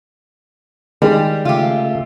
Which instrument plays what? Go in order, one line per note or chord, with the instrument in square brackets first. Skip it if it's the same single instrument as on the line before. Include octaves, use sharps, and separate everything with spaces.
[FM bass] D#3 [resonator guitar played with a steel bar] G3 [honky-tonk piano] G#3
[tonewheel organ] C#3 A3 E5 [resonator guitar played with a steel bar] F4 G4